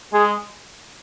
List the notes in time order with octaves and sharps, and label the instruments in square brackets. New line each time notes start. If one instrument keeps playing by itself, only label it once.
[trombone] G#3 [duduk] G#4